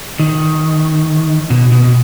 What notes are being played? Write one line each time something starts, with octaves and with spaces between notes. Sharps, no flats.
D#3
B2
B2